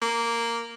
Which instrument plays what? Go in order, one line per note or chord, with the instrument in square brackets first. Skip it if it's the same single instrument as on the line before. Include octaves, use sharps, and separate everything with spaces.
[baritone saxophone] A#3